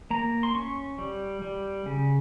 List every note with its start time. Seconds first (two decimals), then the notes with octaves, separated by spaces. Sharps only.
0.10 A#3 A#5
0.43 C6
0.55 C#4 C#6
0.98 G3
1.42 G3
1.86 C#3